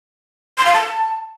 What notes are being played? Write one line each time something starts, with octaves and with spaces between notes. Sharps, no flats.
C6
F5
A5